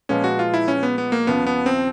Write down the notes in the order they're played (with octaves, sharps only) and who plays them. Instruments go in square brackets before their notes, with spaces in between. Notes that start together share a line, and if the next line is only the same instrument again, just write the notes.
[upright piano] A#2 F3 G#3 B3 [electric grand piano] C#4
[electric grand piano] F#4
F4
E4
C#4
B3
B3
A#3
[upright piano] D#2 C#3 F3 [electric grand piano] B3
[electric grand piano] B3
C4